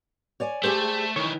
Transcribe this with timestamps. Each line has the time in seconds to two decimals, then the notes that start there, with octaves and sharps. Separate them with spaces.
0.40 C#5 D5 G#5
0.63 A3 G4 G#4 C5 D5 A5
1.16 D#3 E3 C#5